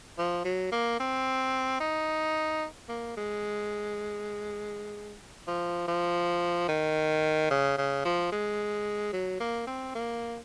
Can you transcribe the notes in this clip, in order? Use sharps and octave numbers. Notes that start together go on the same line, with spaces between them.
F3
F#3
A#3
C4
D#4
A#3
G#3
F3
F3
D#3
C#3
C#3
F3
G#3
F#3
A#3
C4
A#3